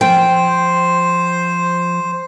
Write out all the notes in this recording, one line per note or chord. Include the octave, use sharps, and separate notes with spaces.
F3 C5 G5